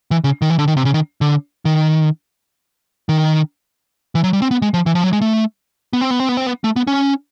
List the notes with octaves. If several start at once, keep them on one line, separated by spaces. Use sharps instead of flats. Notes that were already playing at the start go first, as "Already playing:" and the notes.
E3
C#3
D#3
E3
D3
D#3
C3
C#3
D#3
D3
D#3
D#3
E3
F#3
G3
C4
B3
G#3
F3
E3
F3
F#3
G#3
A3
B3
C4
B3
C4
B3
C4
B3
A3
B3
C#4